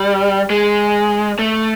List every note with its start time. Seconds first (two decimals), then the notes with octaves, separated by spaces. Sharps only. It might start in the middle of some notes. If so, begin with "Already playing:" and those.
Already playing: G3
0.50 G#3
1.39 A3